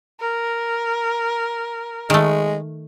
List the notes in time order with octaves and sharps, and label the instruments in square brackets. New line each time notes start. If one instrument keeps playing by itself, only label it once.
[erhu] A#4
[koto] D#3 A3 [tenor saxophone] G#3